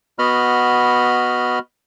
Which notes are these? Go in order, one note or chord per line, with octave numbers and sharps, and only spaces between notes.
B3 F#4 D#5 B5 F6